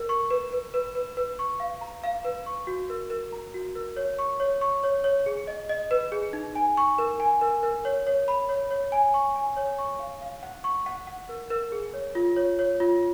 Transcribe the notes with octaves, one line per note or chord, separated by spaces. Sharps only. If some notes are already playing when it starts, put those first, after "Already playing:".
Already playing: A#4
C#6
B4
B4
B4
B4
B4
C#6
F5
A#5
F5
B4
C#6
F#4
A#4
A#4
A#5
F#4
A#4
C#5
C#6
C#5
C#6
C#5
C#5
G#4
D#5
D#5
B4
G#4
D#4
G#5
C#6
A#4
G#5
A#4
A#4
C#5
C#5
B5
C#5
C#5
G#5
C#6
G#5
C#5
C#6
F5
F5
F#5
C#6
F#5
F#5
A#4
A#4
G#4
C#5
F4
C#5
C#5
F4